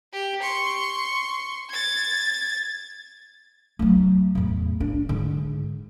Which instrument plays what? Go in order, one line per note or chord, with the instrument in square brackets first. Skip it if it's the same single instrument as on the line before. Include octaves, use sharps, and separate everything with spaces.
[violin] G4
C6 C#6
G#6 A6
[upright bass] F#3 A3
E2 A2
D4
G#2 D3